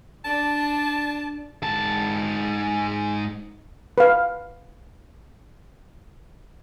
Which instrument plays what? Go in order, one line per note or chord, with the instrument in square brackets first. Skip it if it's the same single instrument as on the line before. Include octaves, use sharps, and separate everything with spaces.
[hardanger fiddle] D4 D5 [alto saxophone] A5
[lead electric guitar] G#2 A5
[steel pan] B4 F5